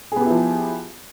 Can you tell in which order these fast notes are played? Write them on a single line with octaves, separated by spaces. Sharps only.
G#4 B3 G4 E4 F3